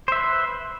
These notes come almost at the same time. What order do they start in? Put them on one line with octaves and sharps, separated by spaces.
C5 E5 B4